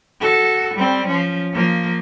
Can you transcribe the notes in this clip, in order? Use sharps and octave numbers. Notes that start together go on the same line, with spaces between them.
F#4 A4
G3 C4
F3 C#4
F3 A#3